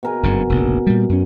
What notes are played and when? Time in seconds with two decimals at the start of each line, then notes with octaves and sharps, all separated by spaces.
0.03 B2 A#4 G#5
0.23 F#1 G2 C#3
0.50 F1 A#1 C#3
0.87 A#2 G3
1.09 F#2 C#4